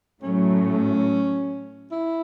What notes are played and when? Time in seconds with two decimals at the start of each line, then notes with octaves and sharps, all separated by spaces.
0.23 A2 F#3 A3 C#4
1.91 E4